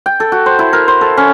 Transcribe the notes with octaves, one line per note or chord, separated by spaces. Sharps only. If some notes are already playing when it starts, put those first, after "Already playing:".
G5
A4
F#4
C5
E4
A#4
C5
A4
C#4